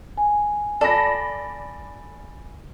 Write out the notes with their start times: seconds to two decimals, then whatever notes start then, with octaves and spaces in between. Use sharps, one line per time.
0.17 G#5
0.81 A4 D5 B5 A#6